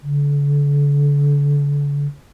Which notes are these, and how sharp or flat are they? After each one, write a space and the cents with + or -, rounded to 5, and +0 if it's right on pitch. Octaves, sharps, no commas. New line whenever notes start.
D3 -40